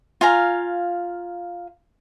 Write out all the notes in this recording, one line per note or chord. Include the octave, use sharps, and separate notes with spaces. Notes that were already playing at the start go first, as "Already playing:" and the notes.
F4 F5 G#5 A#5